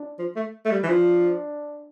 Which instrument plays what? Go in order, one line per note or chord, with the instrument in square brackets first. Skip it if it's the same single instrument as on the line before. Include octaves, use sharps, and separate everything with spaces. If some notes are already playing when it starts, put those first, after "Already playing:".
Already playing: [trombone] D4
[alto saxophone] F3
A3
A3
G3
E3
[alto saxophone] F3 [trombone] D4